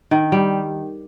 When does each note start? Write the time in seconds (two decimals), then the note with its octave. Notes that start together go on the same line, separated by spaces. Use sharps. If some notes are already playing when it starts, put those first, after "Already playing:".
0.11 D#3
0.32 G3